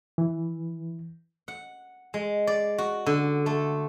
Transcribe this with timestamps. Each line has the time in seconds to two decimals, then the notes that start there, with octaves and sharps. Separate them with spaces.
0.18 E3
1.48 F#5
2.14 G#3
2.47 D5
2.78 F#4
3.06 D3
3.46 A3